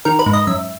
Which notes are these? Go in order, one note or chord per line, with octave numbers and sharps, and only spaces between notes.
D#3 A#4
B4
G#2
D#5
F#2 E5